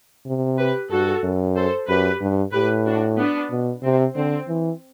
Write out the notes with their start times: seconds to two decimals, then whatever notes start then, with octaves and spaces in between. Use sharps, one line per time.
0.26 C3
0.58 G4 B4
0.91 G2 F#4 A4
1.23 F#2
1.56 A4 C5
1.88 F#2 G4 B4
2.21 G2
2.52 A2 G4 B4
2.86 D4 F#4
3.18 B3 D4
3.50 B2
3.83 C3 C4
4.15 D3 C4
4.48 E3